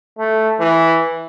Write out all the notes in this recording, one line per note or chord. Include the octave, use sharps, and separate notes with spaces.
A3
E3